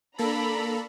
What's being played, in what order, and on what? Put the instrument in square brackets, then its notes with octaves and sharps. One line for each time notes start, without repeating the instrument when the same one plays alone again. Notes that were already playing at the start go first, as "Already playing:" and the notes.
[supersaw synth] A#3 A4 [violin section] D4 A#5 B5